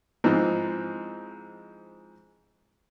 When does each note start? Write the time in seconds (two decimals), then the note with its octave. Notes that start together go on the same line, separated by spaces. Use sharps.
0.24 G#2 E3 F3 C4 D#4